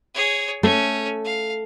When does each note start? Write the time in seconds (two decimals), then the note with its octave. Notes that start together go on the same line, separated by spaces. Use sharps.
0.14 G#4 C#5
0.63 A3 C#4
1.25 F5